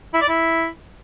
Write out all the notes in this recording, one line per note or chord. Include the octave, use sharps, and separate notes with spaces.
E4
D5
E4